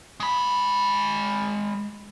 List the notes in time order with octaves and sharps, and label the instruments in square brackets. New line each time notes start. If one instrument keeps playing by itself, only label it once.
[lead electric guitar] G#3 B5